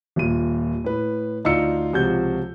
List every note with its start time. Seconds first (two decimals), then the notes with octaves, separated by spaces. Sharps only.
0.16 D#1 A#2 D#7
0.84 A2 B4
1.45 D2 D#4 F4 D5 E6 C#7
1.93 C#2 C3 F3 F#4 G6